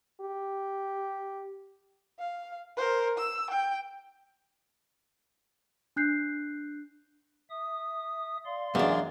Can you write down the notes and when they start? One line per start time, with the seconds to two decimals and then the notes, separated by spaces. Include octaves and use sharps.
0.21 G4
2.19 F5
2.77 A#4 C5
3.18 E6
3.50 G5
5.96 D4 F#6 G6 C7
7.50 E5 D#6
8.45 D5 F5 C6
8.75 F#2 E3 G#3 A#3 D4